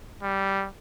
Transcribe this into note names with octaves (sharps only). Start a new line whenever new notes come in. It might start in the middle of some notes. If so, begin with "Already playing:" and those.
G3